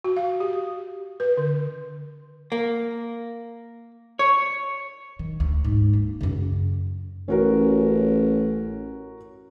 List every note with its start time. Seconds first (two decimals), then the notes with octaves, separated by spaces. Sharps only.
0.04 F#4
0.17 F5
0.40 G4
1.20 B4
1.37 D3
2.52 A#3
4.19 C#5
5.19 D#3
5.40 D2
5.64 G#2
5.93 A#3
6.21 F#2 C#3
7.28 A1 C#4 F#4 A#4